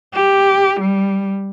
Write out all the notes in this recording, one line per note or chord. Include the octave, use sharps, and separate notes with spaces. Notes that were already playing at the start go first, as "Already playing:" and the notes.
G4
G3